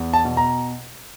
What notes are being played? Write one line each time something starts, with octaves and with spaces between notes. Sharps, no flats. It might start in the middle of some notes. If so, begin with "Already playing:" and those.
Already playing: E2
A5
B2
A#5